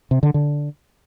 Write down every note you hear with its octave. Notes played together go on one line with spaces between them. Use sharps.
C3
D3
D3